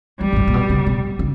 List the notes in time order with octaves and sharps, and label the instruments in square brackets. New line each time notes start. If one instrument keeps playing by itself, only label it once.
[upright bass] E2 [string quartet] G3
[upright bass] G#2
G2
A#2
B2
C#3
B2
C#3